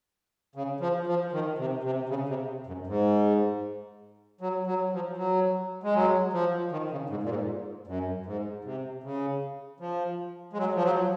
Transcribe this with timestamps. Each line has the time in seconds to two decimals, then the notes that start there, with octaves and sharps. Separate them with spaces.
0.55 C#3
0.80 F3
1.07 F3
1.32 D#3
1.58 C3
1.84 C3
2.09 C#3
2.29 C3
2.67 F#2
2.87 G#2
4.41 F#3
4.67 F#3
4.93 F3
5.17 F#3
5.83 G#3
5.95 F#3
6.33 F3
6.72 D#3
6.91 C#3
7.10 G#2
7.23 A#2
7.29 G#2
7.87 F#2
8.26 G#2
8.65 C3
9.03 C#3
9.80 F3
10.53 G#3
10.58 F#3
10.75 F3
10.83 F#3